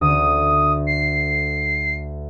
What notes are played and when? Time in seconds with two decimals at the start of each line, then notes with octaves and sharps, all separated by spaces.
0.01 D2 D#6
0.87 C7